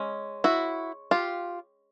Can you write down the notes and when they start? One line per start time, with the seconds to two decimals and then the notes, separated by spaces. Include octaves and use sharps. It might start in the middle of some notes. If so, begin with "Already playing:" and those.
Already playing: G#3 C#4
0.44 E4 F#4
1.11 F4 G4